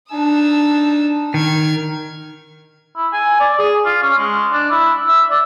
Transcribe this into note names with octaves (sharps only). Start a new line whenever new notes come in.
D4 D#4 A5 D#6 E6
D#3 F6 G#6
E4
G#5
D5
G#4
F4
C#4
G#3
D4
E4
E5
D5